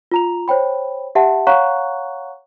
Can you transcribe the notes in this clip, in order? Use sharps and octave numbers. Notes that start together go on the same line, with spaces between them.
F4 A#5 F7
C5 C#5 G5 B5
G4 E5 F#5 A5
C#5 F5 F#5 A#5 C#6 F#6